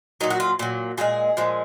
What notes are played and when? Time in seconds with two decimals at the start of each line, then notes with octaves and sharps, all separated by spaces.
0.21 A#2 F#3 D#4
0.30 F#4
0.40 F4
0.59 A#2 F#3
0.98 A#2 F3 G#3 G#4
1.37 A#2 F3 G#3